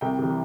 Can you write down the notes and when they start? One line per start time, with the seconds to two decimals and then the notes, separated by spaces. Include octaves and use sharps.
0.01 C2 G5
0.19 C3 E3 G3